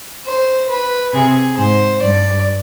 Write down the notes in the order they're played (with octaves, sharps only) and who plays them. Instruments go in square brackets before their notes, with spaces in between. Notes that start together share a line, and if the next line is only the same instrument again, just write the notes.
[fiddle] C5
B4
[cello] C3 [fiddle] G#4
[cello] G#2 [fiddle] C5
[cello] G2 [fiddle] D5